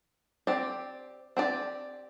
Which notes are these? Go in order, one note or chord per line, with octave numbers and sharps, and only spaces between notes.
C4 G4 D5
C4 G4 D5